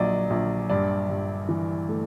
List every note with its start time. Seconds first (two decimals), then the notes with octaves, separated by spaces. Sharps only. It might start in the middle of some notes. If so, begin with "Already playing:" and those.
Already playing: A#1 F#3 D5 D#5
0.30 A#1
0.70 G2 D5
1.09 G2
1.49 E3
1.89 A3